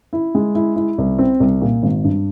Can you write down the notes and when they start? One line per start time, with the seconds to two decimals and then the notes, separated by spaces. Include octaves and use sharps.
0.13 E4
0.35 G#3
0.55 E4
0.76 E4
0.98 C2
1.19 C4
1.40 C2
1.62 A#2
1.83 G#1
2.04 G2